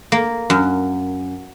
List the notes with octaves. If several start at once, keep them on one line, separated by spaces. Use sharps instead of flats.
A#3
F#2